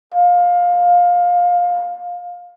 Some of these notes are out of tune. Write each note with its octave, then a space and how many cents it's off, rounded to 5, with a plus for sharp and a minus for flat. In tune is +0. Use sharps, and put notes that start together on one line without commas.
F5 +20